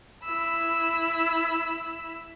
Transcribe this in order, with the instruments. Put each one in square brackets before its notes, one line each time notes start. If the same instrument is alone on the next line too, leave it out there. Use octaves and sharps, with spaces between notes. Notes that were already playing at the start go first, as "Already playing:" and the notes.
[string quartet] E4 B5 E6